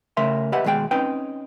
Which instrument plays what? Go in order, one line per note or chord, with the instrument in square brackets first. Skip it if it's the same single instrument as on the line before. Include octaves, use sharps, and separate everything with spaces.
[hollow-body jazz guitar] C#3 A3 A#4 E5 C6
G4 B4 D#5 E5 F#5
D#2 B2 G#3 G#4 G5
C4 C#4 D#4 B4 G5